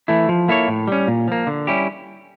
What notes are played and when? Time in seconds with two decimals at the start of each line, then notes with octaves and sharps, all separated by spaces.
0.08 E3 A3 E4
0.29 F3
0.48 A#3 E4 A4 C#5
0.68 A2
0.88 G3 C#4
1.08 A#2
1.28 F3 A#3
1.47 D3
1.67 G3 C#4 E4 G4